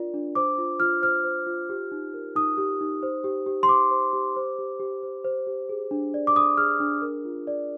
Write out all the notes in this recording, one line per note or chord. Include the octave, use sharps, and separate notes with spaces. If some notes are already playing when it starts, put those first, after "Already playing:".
Already playing: D4 F4 A#4 D5
D4
C5 D6
F4
F4 F6
C5 F6
C5
F4
G4
D#4
A#4
D#4 D#6
G4
D#4
C5
G4
G4
C6
C5 D6
C5
G4
C5
G4
G4
C5
C5
G4
G#4
D4
D5
D6
D4 D#6
G#4 F6
D4
A#4
F4
D5